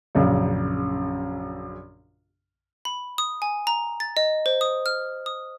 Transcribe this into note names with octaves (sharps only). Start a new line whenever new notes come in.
A#1 F#2 C#3
B5
D#6
G#5
A#5
A6
D#5
C5
D#6
F6
D#6